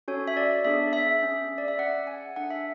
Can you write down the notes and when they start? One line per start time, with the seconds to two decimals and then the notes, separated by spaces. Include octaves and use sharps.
0.08 C#4 F#4 A4 C#5
0.28 E5
0.37 D5
0.65 B3 D4 G#4 E5
0.93 E5
1.22 C#4 G#4
1.58 D5
1.68 E5
1.79 C#4 G#4 F#5
2.07 G#5
2.36 D4 A4 F#5
2.51 E5